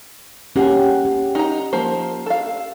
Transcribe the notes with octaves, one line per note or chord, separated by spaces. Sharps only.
A#3 C#4 G4 G#4 F#5
G4
D#4 A#5
F3 A#3 C5
A4 F5